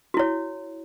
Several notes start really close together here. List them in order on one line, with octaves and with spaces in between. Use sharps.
F#4 E4 C#5